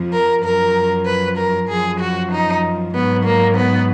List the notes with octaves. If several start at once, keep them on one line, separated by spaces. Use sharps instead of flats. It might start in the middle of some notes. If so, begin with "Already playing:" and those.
Already playing: F2 F3
A#4
F#2 F3 A#4
B4
A#4
F#2 F3 G#4
F#4
D#4
G#2 F#3 B3
A#3
B3